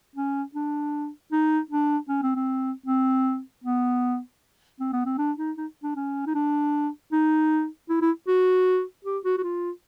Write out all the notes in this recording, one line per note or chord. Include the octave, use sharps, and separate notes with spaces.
C#4
D4
D#4
D4
C#4
C4
C4
C4
B3
C4
B3
C4
D4
D#4
D#4
D4
C#4
D#4
D4
D#4
E4
E4
F#4
G4
F#4
F#4
F4